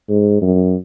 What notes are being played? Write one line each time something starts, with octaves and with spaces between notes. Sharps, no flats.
G#2
F#2